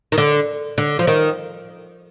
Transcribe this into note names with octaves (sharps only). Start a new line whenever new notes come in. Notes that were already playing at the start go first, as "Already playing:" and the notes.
D#3
D3
D3
F3
D#3